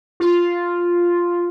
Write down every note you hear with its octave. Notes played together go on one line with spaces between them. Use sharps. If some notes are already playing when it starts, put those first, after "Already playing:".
F4